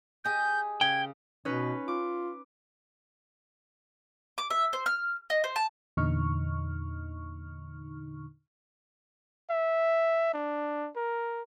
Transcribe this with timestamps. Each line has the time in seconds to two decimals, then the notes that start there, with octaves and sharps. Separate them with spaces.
0.25 G4 G#4 D#5 G6
0.81 C#3 G5 G#6
1.45 B2 C#4 D#4 B4
1.88 F4 D6
4.38 D6
4.50 E5
4.73 C5
4.86 F6
5.30 D#5
5.44 C5
5.56 A5
5.97 E2 A#2 D3 D#4 C#6 F6
9.50 E5
10.33 D4
10.96 A#4